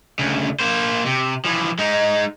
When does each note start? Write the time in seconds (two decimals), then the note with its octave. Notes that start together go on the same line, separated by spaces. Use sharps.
0.19 D2 C#3
0.59 A#3 C5
1.06 C3
1.45 E3 F3
1.79 G#3 D#4